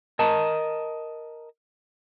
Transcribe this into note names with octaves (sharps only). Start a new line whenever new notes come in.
A#4 D#5 A5